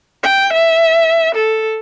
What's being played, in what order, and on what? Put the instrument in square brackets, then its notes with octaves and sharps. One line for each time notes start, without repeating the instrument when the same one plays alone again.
[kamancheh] G5
E5
A4